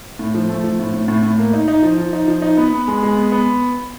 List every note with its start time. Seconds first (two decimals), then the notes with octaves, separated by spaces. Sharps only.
0.19 A2
0.34 F3
0.49 A3
0.64 F3
0.79 A2
0.94 A2
1.08 A2
1.23 A2
1.38 A#3
1.53 D#4
1.68 D#4
1.83 F3
1.98 F3
2.13 D#4
2.28 F3
2.42 D#4
2.57 B3
2.73 B3
2.88 G#3
3.03 G#3
3.17 B3
3.32 B3